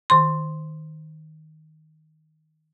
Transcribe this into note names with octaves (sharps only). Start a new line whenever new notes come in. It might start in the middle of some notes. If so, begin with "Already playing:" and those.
D#3 C6